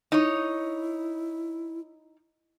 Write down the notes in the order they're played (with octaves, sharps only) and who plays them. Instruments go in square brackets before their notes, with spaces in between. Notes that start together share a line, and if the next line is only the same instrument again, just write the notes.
[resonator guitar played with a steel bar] D#4 C#5 [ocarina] E4